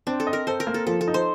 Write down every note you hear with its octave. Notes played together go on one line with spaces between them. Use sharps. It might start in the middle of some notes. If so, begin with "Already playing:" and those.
C4 D4
A4
D#5
A#4
A4 C5
A#4
A#3
A4
F3 A4
A4
D#4
C5